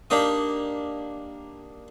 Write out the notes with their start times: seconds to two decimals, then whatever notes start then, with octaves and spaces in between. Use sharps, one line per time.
0.10 A#3 D4 D#4 G4 D#6